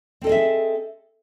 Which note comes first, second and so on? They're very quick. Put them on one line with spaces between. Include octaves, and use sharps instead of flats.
C4 A4 D#5 G#4 E5